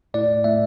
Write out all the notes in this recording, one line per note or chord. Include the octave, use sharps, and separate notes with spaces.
A2 A3 E4 D5
A2 A3 E4 E5